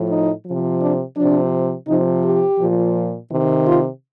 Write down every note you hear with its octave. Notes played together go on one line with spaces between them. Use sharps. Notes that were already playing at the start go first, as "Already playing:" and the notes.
Already playing: A2 F3
D#4
C3 F3
D4
C3 F3 D4
C3 F3 D#4
G4
A#2 F3
C3 D#3
F4